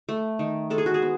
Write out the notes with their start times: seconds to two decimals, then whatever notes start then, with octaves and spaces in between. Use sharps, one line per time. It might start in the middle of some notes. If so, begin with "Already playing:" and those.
0.09 A3
0.39 D#3
0.70 G#3 A4
0.78 G#4
0.86 F#4
0.94 G#4
1.02 B3